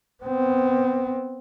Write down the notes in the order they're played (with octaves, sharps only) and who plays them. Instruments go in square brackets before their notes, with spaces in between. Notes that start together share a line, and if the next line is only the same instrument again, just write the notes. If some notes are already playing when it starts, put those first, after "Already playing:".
[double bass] B3 C4